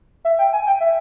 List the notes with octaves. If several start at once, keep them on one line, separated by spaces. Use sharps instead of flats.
E5
G5
G#5
G5
E5